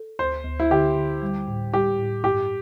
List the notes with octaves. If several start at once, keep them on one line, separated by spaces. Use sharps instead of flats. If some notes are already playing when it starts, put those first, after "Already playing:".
Already playing: A4
D2 C5
D2
E4
D3 G4
D3
G3
A2
G3 G4
A2
G2 G4